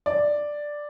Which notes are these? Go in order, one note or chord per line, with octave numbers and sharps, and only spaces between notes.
D5